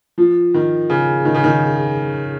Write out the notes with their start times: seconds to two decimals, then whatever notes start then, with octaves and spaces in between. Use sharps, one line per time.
0.18 F3
0.54 D#3
0.90 C#3
1.25 D#3
1.34 C#3
1.44 D#3